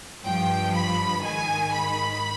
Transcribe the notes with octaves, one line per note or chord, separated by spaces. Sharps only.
G2 F3 G5
B5
G#2 D#3 G#5
B5